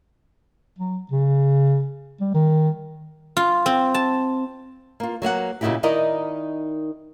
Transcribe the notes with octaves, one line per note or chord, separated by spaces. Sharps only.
F#3
C#3
G3
D#3
F4
C4
A5
A#3 F4
F#3 A#3 F5 F#5
A#2 C#3 D#4 E4 F#4 G4
D#3 D#4 E4 A#4 D5 D#5